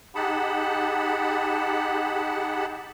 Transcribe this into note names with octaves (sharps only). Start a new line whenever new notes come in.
D#4 G4 G#4 F#5 A5 B5